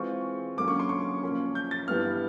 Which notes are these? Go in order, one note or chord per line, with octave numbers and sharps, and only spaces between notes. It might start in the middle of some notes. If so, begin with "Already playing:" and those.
Already playing: E3 G#3 C4 F4 C#6
D3 F#3 A#3 C#4 D6
C#6
C6
C#6
A#2 F3 A#3 C#4
G6
A6
G2 E3 G3 B3 E4 F6